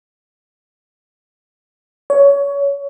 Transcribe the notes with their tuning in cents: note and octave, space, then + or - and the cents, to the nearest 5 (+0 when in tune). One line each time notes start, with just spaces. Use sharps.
C#5 +20